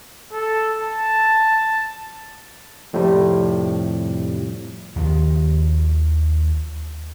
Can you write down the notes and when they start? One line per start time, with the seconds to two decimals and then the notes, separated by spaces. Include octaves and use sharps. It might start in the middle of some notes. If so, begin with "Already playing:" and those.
0.32 A4
0.80 A5
2.93 F2 A2 C3 F3 G3
4.96 D#2 D#3 F3